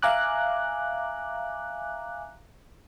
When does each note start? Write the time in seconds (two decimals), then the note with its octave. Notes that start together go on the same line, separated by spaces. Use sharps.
0.02 E5 F5 G#5 A#5 D6 F#6